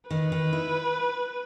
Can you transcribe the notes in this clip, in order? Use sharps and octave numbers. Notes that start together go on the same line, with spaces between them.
D#3 B4
D#3
E4